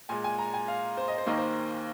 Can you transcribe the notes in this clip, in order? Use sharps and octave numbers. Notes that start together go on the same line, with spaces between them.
A#2 G#3 G#5
G#5
A#5
G#5
F5
C5
D#5
C5
D#2 D#3 A#3 D#5
C5